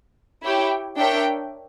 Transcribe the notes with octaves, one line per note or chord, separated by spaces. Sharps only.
E4 G4 C#5 G5
D4 A#4 C#5 E5 G5